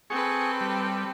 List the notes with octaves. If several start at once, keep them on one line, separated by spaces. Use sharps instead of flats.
C4 G#4 A4 B4 C#6
G3